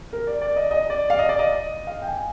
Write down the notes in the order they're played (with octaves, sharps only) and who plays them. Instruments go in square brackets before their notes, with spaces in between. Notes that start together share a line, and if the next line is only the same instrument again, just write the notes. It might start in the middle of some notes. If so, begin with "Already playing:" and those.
[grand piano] A#4
D5
D5
D#5
D#5
D5
F5
D#5
D5
D#5
F5
G5
G#5